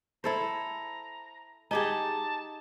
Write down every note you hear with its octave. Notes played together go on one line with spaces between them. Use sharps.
E4 A4 C5 A#5
D#4 G4 G#4 A5